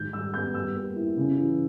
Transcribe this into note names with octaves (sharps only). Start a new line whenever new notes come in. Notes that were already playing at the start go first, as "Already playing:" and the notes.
Already playing: G#2 D#3 G6
G3 E6
B3 G6
G3 E6
A#3
E4
C#3
E3